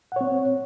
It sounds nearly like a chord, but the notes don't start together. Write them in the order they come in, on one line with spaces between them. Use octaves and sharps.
F#5 C#5 C4